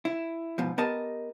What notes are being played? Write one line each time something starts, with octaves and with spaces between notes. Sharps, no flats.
E4
G#2 B2 F3
B3 G4 A#4 D#5 A5